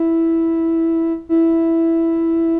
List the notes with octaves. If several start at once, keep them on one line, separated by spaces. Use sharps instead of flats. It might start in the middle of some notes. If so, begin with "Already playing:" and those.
Already playing: E4
E4